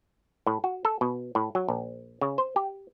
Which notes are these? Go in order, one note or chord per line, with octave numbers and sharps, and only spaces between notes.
A2
F#4
A4
B2
A2
F#3
A#1
C#3
C5
G4